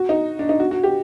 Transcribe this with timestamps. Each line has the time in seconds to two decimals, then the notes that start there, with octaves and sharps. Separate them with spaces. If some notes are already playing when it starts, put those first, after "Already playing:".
Already playing: F#4
0.09 D#4
0.39 D4
0.49 D#4
0.60 F#4
0.71 F#4
0.83 G4